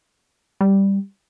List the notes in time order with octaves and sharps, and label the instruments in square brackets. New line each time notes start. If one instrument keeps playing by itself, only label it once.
[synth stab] G3